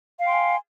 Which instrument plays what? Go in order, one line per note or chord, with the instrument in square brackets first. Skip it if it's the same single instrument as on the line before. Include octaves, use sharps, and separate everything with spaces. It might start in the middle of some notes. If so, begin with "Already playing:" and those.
[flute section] F5
G5
C6
G#5